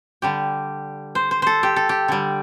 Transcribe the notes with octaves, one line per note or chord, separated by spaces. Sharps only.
D3 G3 G4
C5
C5
A4 C5
G4
A4
G4
D3 G3